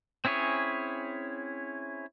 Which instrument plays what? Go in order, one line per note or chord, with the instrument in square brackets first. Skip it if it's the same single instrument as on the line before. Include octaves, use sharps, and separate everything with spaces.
[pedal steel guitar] C4 C#4 E4 G#4 C#5